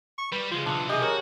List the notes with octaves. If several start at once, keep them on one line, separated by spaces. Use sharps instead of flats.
C#6
G3 G4 B4
C#3 F3 G#3 F4
B1 E3 D4 D#6
C3 G4 G#4 D#5
F#4 A#4 C#5